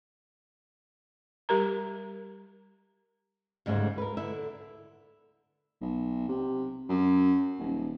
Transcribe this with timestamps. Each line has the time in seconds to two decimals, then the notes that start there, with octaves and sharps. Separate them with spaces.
1.49 G3 G4 A#4 A#5
3.66 D2 G#2 C#3 G3 G#4 C5
3.98 A#4 B4
4.17 D3 E4 E5
5.81 B1
6.29 C3
6.89 F#2
7.59 D#1